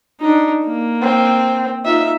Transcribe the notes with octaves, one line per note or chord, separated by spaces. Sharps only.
D4 D#4
A#3
C4
D#4 F4 E5